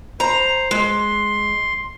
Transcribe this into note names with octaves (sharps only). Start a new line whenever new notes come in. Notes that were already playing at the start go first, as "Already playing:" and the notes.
C5 A#5
G#3 C6